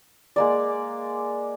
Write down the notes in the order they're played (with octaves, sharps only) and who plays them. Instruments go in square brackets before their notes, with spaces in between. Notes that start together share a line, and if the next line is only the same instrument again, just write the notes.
[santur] G#3 A#3 D5